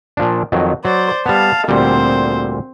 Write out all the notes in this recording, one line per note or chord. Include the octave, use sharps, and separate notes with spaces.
A#2 F3 D4
F2 D#3 F#3
F#3 C5 D5
G3 B3 F5 A5
D2 A#2 G3 C4 C5